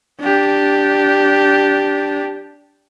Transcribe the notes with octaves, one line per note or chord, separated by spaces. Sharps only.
D4 G4